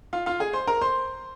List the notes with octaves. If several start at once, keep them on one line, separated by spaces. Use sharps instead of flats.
F4 F5
F4 F5
G#4 G#5
C5 C6
A#4 A#5
C5 C6